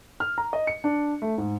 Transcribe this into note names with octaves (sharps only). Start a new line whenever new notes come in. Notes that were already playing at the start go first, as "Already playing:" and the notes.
F6
A#5
D#5
C#7
D4
A3
G#2